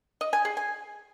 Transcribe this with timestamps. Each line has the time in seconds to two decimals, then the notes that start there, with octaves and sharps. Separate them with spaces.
0.21 D#5
0.33 G#5
0.45 G#4
0.57 G#5